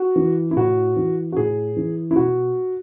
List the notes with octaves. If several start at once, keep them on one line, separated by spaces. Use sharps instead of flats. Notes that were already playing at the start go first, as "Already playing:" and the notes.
Already playing: F#4
E3
E4
A2 F#4
E3
F#4
A2 G#4
E3
E4
B2 F#4